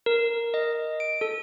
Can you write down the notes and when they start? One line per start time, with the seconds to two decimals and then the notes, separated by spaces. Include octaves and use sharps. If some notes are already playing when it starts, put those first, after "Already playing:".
0.06 A#4
0.54 D#5
1.00 D7
1.21 A4